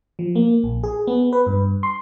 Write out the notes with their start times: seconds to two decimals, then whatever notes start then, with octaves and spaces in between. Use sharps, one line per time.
0.19 F3
0.35 A#3
0.64 A#1
0.83 G#4
1.07 B3
1.33 B4
1.47 G2
1.83 C6